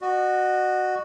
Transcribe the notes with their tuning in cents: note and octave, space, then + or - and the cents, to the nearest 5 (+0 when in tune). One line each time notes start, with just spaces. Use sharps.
F#4 +0 D#5 -40